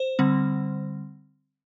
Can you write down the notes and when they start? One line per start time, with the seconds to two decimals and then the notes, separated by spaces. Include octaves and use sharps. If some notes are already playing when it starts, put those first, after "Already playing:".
Already playing: C5
0.19 D3 G3 C4